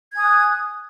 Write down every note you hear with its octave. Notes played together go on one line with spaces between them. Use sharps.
G#5 D#6 F#6 G#6